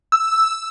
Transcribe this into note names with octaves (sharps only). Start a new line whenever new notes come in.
E6